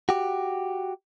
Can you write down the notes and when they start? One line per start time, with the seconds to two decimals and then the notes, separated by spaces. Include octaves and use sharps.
0.09 F#4 G4